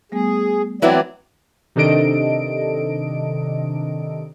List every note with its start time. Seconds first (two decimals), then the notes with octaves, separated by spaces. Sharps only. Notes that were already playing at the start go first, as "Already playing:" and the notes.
0.12 G3 A3 B3 G#4
0.82 E3 F#3 B3 C4 E4 D5
1.76 C3 D#3 D4 A4 D#5 D7